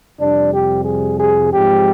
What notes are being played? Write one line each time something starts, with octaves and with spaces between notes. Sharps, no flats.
F2 C3 G3 D4
G4
G#4
G#4
G#2 F3 G#3 C4 G4